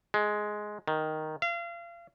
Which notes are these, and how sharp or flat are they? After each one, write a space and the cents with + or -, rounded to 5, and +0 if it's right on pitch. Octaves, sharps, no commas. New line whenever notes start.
G#3 +10
D#3 +0
F5 -35